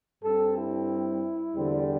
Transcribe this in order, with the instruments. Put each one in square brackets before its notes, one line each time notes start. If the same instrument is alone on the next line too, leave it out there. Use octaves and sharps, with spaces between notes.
[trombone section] G2 G3 C4 A4
E4
E2 D3 G3 C4